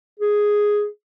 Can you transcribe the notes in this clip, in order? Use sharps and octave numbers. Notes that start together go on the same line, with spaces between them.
G#4